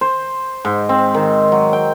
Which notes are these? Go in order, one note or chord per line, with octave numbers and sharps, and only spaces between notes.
C5
G#2
C4
D#3
F#3
G5